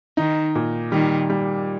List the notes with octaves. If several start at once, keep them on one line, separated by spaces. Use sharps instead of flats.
D#3 D#4
A#2
D#3 G3
G3